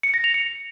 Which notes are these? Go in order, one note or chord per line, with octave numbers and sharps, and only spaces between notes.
C#7
A#6
F7
C#7